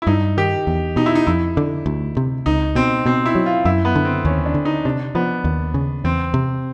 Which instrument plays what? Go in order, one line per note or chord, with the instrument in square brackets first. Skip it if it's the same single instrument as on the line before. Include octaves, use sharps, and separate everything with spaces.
[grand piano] E4
[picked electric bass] G2 [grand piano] D#4
[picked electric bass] D#3 [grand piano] G4
[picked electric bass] E2
[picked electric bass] B2 [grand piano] D#4
[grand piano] E4
D#4
[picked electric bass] F2 [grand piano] E4
[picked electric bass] D3
D2
C3
[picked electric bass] C#2 [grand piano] D#4
[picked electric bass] B2 [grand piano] C4
[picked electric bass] B2 [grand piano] C4
[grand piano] E4
[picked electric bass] F#3
[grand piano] F4
[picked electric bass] F#2 [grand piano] E4
[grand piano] B3
[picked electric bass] D3
[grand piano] C4
[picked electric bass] D#2 [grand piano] C#4
[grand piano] D4
[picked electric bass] D3
[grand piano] D#4
[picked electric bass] C3 [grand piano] D4
[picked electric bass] F3 [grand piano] B3
[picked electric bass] D#2
C#3
[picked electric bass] E2 [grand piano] C4
[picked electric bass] C3